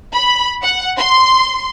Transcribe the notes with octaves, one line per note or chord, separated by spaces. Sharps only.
B5
F#5
C6